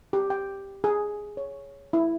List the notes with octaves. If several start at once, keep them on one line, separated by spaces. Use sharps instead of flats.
G4
G5
G#4
C#5
E4